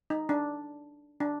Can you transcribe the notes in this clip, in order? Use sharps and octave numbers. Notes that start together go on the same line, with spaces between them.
D#4
D4
D4